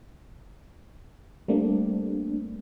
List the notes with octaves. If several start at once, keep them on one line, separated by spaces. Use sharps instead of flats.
G3 A3 A#3 C4 D4